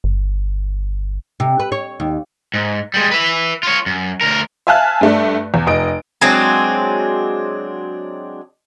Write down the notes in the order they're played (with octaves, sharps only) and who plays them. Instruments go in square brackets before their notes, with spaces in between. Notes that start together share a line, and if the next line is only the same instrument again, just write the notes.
[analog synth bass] G1
[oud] C3
B4
C#5
D#2
[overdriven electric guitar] G#2
G3 G#3
B4 E5
F4 C#5
F#2
D2 A#4
[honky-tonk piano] E5 F5 G#5 A5 F6 F#6
G2 A3 D4
E2
F1 D#5 D7
[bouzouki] F#3 G#3 C4 D4